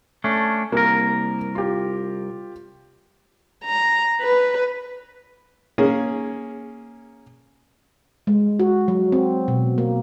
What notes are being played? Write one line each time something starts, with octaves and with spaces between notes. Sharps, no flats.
A3 C#4 D4
C2 A#3 A#4
F4 G4
A#5
B4
A#3 C#4 G#4
G#3
F#4
F#3
C4
B2
A#3